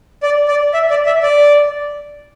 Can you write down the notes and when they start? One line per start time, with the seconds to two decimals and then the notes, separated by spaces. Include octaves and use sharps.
0.23 D5
0.48 D5
0.73 E5
0.90 D5
1.07 E5
1.23 D5